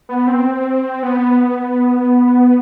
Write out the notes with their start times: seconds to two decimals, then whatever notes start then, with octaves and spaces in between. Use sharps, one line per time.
0.09 B3
0.27 C4
1.03 B3